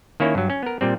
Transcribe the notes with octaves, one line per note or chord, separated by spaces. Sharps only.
D#3 A#3 C#4 E4 C#5
G2 F#3
C#4
B3 A#4
A#2 G3 C4